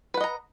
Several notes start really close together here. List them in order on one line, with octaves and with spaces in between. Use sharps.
B4 F#5 D#5 A#5